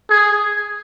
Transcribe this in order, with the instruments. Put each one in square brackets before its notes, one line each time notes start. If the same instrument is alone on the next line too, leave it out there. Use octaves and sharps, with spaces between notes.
[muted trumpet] G#4